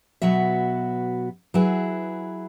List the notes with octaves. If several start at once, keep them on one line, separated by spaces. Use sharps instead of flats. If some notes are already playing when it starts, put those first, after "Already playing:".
B2 F#3 B3 F#4 E5
F#3 E4 G#4 B4